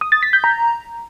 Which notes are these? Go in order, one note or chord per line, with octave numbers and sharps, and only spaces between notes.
D#6
A6
B6
G6
A#5